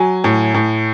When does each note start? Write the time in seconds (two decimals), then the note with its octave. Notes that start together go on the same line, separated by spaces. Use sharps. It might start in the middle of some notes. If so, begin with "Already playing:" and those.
Already playing: F#3 G#5
0.24 A2
0.54 A2